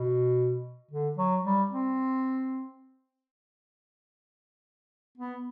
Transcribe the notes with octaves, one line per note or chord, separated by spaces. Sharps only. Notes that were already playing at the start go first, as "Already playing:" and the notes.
Already playing: B2
D3
F#3
G3
C4
B3